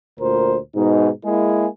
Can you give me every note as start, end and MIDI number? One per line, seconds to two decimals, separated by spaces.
0.20 0.58 38
0.20 0.58 46
0.20 0.58 70
0.20 0.58 72
0.75 1.10 44
0.75 1.10 47
0.75 1.10 63
1.25 1.67 56
1.25 1.67 58
1.25 1.67 64
1.25 1.67 68